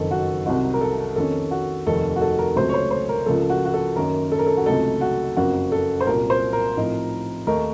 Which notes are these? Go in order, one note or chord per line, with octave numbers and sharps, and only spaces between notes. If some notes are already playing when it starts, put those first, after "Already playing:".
Already playing: F#1 F2 D#3 A4
F#4
C2 C3 F#3 C4 D#4 F#4
A#4
A4
F2 D#3 A#3 C#4 A4
F#4
F1 D#2 D#3 A4
F#4
A4
A#4
C#2 C3 F#3 A3 C5
C#5
C5
C5
A#4
C#2 C#3 F3 A#3 A4
F#4
F#4
A4
F#2 D#3 A#3 C#4 A#4
A4
A#4
A4
F#4
C#2 C3 F#3 A3 D#4 A4
F#4
F#1 F2 C#3 F#3 A#3 F#4
A4
C5
C2 A#2 F#3 A#3 A#4
C5
A#4
A2 F3 C4 D#4
D#2 D#3 A3 D#4 A#4